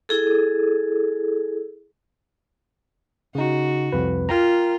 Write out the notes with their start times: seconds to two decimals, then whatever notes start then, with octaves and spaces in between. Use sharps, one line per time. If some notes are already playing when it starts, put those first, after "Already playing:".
0.09 E4 G#4 A4
3.35 C#3 D#4 F#4
3.92 C2 F2 B4
4.29 F4 A#4 G5 A#5